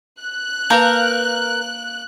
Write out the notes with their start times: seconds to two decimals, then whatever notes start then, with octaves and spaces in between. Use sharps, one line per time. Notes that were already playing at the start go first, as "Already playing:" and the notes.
0.20 F#6
0.70 A#3 A#4 B4 F5 G6